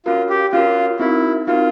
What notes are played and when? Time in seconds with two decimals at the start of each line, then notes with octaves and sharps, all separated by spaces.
0.06 C#4 F4 F#4 A#4
0.30 G4
0.53 C#4 F4 F#4 A#4
1.00 C4 D#4 E4 F#4 A#4
1.47 C4 D#4 F4 F#4 A#4